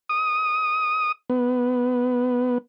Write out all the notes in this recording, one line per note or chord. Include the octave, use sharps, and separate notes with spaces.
D#6
B3